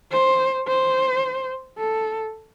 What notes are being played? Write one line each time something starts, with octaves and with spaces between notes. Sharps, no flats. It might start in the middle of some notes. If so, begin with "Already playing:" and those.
C5
C5
A4